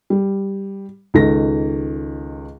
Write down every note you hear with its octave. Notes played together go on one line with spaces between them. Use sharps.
G3
C#2 D#3 A4 A#6